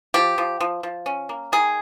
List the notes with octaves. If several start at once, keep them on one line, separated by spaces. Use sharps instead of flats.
F3 G4
F3
F3
F3
C#4
A#3
D#3 G#4